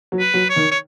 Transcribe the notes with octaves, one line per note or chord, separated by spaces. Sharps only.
F#3
B4
F#3
C#5
D#3
C#5